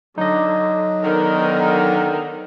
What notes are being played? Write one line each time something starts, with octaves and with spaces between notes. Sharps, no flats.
D3 F#3 D#4 D#5
D3 D#3 B3 A#4